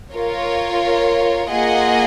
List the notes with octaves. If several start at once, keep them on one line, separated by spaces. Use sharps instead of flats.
F4 A#4 C#5
A#3 F4 G#4 D#5 F#5